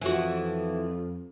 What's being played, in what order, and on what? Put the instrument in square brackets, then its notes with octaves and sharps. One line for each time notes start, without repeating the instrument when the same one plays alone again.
[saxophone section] F2 [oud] E3 F#4